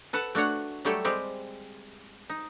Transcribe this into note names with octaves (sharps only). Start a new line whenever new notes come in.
A4 B4 F#5 A5
A3 D4 F#4 C#5 F#5
F#3 G3 A3 G4 A4 C#5
G3 G#3 C4 G4
D#4